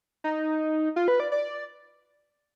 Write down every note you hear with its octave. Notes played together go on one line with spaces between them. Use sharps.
D#4
F4
B4
D5
D5